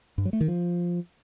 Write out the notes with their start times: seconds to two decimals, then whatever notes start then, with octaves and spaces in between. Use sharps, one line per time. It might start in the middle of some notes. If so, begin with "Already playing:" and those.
0.18 G2
0.25 F#3
0.33 A3
0.41 D#3
0.48 F3